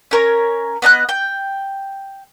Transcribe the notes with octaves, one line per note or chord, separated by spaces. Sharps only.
C#4 A#4 C#5
B3 D#5 A5 F#6
G5